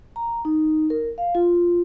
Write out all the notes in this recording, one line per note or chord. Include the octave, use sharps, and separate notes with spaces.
A#5
D#4
A#4
F5
F4